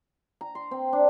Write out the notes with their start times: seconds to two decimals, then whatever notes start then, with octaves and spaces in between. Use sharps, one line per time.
0.41 A#5
0.55 C6
0.71 C4
0.93 D4